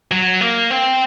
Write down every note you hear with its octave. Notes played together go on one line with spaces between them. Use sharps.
F#3
A#3
C4